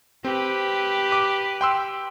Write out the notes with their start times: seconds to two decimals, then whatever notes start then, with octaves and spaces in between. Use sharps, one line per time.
0.24 C4 G4 B4
1.12 D6
1.61 G5 C6 E6